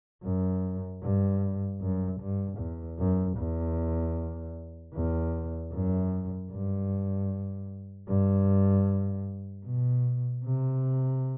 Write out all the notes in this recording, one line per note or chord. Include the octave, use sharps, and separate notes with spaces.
F#2
G2
F#2
G2
E2
F#2
E2
E2
F#2
G2
G2
B2
C3